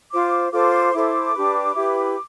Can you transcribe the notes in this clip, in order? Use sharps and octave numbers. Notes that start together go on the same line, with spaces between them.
F4 C5 D6
F4 A4 C5 D6
E4 A4 C5 D6
D4 G4 B4
E4 G4 B4